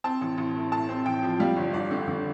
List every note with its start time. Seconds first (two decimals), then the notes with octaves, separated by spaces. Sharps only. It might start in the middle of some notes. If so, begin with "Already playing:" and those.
0.04 C4 A5
0.21 A1
0.38 A1
0.55 A2
0.72 A2 A5
0.89 C4
1.06 A1 G5
1.23 F3
1.39 G3 F5
1.56 G1
1.73 G1 D5
1.91 D3
2.08 D3